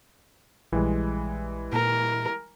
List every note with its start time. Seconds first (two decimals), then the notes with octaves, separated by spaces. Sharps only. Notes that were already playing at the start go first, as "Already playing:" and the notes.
0.73 A#1 E3 G3 G#3
1.73 A#2 A#4